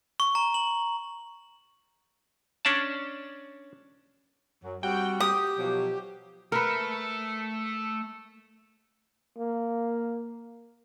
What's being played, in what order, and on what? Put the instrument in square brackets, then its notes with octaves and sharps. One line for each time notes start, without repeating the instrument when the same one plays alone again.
[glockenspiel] C#6
A#5
F#7
[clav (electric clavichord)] C#4 D4 D5 A5
[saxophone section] F#2 F#3
[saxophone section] G3 C4 F#4 [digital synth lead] G5
[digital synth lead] G4 [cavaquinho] D#6
[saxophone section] B2 F3 F#3
[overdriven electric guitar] A3 [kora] A#4 B4
[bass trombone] A#3